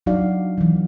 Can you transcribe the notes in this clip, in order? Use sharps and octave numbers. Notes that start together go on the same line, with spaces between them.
F#3 D4 D#4 F#4 D5 F5
E3 F#3